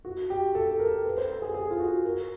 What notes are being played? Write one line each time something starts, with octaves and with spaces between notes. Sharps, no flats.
F#4
G4
A4
A#4
B4
C5
A4
G#4
G#4
F4
F#4
A#4